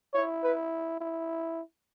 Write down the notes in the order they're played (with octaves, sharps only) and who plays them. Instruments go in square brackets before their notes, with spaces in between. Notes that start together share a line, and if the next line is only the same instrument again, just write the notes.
[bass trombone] E4 [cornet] C#5
[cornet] B4
[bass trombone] E4